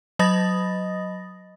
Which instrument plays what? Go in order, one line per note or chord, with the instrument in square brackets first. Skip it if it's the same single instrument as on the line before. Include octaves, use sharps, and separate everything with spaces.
[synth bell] F#3 D#5 B5 D#6 A6 A#6